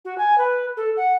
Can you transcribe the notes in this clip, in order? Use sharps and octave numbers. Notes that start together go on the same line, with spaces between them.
F#4
G#5
B4
A4
F#5